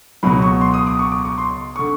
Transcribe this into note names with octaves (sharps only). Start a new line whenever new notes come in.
C#2 B2 F#3 B5
C#6
C6
D#6
D6
C#6
D6
C#6
C6
D3 C#6